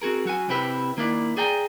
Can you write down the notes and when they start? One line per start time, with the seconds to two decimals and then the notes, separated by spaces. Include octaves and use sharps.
0.02 C4 F#4 G#4 A#4
0.25 F#3 F#4 G#5
0.49 C3 C4 E4 G4 B4
0.97 D#3 A#3 D4 E4 D5
1.37 G#4 D5 G5 G#5 A#5